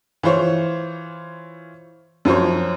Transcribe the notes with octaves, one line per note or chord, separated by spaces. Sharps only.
E3 F4 C5 C#5
F#2 F3 C5 C#5